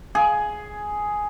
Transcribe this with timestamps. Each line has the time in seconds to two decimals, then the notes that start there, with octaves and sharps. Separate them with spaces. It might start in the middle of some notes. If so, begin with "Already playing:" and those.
0.15 G#4